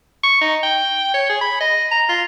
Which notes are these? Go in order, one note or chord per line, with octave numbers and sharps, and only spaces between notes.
C#6
D#4
G5
C#5
G#4
B5
D#5
A#5
F4